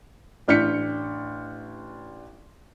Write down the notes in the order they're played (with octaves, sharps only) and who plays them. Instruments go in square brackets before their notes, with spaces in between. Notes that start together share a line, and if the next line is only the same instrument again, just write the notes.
[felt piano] A1 D4 F6 G6 B6 C#7